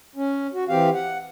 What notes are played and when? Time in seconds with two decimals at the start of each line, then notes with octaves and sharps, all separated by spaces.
0.16 C#4
0.53 F#4
0.69 E3 C4 G4 F5
0.94 F#5